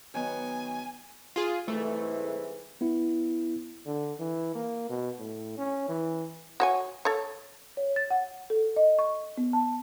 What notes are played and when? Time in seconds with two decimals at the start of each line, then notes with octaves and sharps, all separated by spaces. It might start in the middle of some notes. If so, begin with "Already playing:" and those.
0.14 D#3 F#3 B3 G#5
1.36 F4 G#4
1.68 C2 G#2 E3 A3
2.81 B3 E4
3.86 D3
4.19 E3
4.55 A#3
4.89 B2
5.19 A2
5.58 C#4
5.88 E3
6.60 F#4 C#5 G#5
7.05 A4 C#5
7.77 C#5
7.96 A6
8.10 F#5
8.50 A4
8.76 D#5
8.99 C#6
9.38 B3
9.53 A5